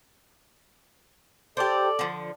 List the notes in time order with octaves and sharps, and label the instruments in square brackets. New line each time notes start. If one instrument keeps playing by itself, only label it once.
[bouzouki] G4 C5 [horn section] A4 D5
[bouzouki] D3 F3